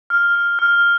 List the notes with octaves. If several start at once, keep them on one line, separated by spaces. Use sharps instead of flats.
F6
F6
F6